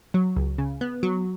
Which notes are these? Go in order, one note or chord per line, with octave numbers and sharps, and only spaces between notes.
F#3
C#2
C#3
B3
F#3